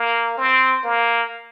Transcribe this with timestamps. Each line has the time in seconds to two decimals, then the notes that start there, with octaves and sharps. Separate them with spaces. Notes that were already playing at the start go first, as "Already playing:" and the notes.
Already playing: A#3
0.38 C4
0.84 A#3